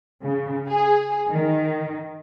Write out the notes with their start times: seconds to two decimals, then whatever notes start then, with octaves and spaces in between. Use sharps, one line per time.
0.23 C#3
0.68 G#4
1.29 D#3